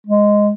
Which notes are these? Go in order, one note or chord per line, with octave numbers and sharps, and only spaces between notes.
G#3